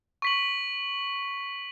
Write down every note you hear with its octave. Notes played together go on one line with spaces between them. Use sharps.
C#6 B6 F#7